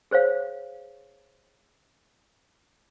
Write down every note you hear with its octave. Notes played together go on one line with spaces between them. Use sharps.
G#4 C5 C#5 F5